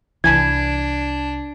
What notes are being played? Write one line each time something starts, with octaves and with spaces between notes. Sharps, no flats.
C2 E3 D4 E4 G#5 B5 G#6